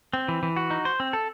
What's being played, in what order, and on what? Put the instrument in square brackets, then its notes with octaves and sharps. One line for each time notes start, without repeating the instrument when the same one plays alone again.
[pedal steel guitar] C4
E3
E3
F#4
D#4
C5
C4
A4